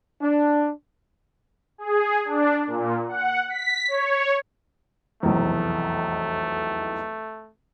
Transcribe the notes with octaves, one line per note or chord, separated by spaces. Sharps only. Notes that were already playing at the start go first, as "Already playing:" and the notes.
D4
G#4
D4
A#2
F#5
B6
C#5
F1 B1 E2 A3